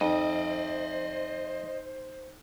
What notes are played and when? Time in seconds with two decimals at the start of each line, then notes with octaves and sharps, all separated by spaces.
0.01 F2 D#4 C5 D5 D#5